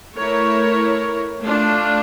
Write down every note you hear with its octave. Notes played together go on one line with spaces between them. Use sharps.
A3 E4 A#4 C#5
A3 D4 F4